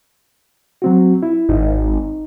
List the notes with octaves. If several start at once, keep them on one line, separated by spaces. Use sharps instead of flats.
F#3 C4 F#4
E4
G#1 D#4